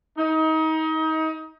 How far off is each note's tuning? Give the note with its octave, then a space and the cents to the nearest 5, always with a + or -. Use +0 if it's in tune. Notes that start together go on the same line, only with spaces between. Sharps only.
D#4 +30